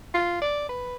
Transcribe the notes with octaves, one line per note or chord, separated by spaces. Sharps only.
F4
D5
B4